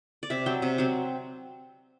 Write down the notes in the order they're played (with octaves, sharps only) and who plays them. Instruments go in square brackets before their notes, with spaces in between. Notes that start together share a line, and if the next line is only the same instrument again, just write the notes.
[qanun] D5
C3 E5
F#3 C4 G5
C3
F#3 C4